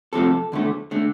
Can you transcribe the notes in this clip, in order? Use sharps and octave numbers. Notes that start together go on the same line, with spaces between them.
D2 C3 F3 A3 A4
E2 D3 A3
D3 A3